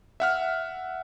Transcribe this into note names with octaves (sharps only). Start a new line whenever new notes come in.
E5 F#5 F6